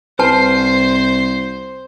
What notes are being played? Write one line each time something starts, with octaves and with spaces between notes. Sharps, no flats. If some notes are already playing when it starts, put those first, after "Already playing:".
C2 B4 C5 A5 C7